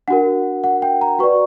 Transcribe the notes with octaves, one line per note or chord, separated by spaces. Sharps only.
D4 F#4 A#4 F#5
F#5
G5
A#5
F#4 B4 D5 C#6